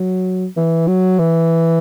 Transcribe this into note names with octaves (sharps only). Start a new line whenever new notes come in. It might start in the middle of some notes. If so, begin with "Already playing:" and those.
Already playing: F#3
E3
F#3
E3